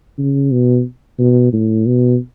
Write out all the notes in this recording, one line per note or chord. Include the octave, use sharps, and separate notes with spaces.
C#3
B2
B2
A2
B2